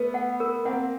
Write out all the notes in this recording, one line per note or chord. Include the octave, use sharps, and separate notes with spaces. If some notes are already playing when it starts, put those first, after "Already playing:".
Already playing: A3 B3 B4
F#5
A#4
A#3 C4 F#5